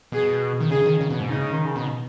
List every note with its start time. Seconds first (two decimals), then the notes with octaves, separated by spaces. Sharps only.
0.12 B2 G#4
0.60 D#3
0.70 C#3 G#4
0.86 D#3
1.01 C#3
1.10 B2
1.20 G#2
1.29 C#3 D#4
1.52 D#3
1.65 C#3
1.76 B2